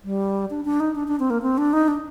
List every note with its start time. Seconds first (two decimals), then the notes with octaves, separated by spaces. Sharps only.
0.04 G3
0.50 D4
0.65 D4
0.80 D#4
0.95 D4
1.08 D4
1.20 C4
1.30 A#3
1.42 C4
1.58 D4
1.73 D#4
1.88 D4